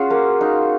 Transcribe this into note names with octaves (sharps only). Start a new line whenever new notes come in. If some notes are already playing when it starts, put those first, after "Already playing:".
Already playing: C#4 F4 F#4 G#4
A#3
D#4